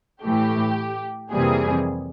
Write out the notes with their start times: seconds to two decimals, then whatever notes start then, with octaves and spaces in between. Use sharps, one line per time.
0.22 A2 E3 A3 G4
1.31 F2 C3 E3 G3 A#3 G#4